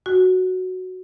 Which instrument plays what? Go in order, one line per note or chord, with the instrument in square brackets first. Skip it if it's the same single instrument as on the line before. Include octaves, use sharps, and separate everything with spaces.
[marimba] F#4